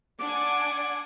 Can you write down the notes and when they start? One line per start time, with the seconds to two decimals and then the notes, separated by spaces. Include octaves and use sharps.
0.20 D4 F#5 G#5 D6